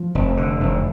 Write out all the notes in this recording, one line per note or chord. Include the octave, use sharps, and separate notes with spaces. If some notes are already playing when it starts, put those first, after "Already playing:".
Already playing: F3
F1
D3
F1